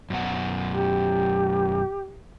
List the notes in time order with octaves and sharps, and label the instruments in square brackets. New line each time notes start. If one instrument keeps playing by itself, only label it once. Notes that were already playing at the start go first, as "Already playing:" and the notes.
[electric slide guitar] F#2 B2 F#5
[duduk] G4